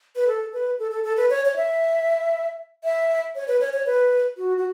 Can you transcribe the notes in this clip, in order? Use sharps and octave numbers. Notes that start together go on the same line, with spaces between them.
B4
A4
B4
A4
A4
A4
B4
C#5
C#5
E5
E5
C#5
B4
C#5
C#5
B4
F#4
F#4